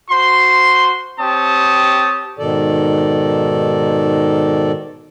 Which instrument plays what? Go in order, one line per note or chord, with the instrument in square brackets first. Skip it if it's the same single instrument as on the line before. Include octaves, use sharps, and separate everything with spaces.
[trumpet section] F#4 C5 C6
C4 G4 C#5 A5 D#6
[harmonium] G#2 B2 D#3 A4 D5